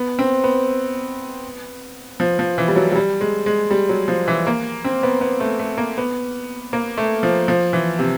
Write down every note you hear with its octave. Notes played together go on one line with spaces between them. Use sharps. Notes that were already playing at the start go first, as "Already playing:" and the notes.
Already playing: B3
C4
B3
F3
F3
E3
G3
F#3
F#3
G3
G#3
G#3
G3
F#3
F3
E3
A#3
C4
B3
B3
A3
A3
A#3
B3
A#3
A3
F3
F3
E3
C3